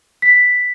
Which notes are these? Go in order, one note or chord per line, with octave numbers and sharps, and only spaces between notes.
B6